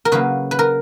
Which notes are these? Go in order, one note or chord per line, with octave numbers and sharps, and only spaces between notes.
A#4
C#3 F#3 A#3 B4
B4
A#4